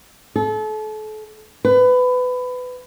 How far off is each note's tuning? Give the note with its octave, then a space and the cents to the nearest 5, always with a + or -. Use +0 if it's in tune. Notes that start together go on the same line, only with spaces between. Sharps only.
A4 -35
B4 +20